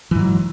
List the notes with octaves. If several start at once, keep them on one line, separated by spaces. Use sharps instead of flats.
G#2 E3 F#3